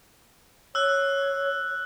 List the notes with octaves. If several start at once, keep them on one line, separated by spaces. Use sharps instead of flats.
C#5 E6 F#6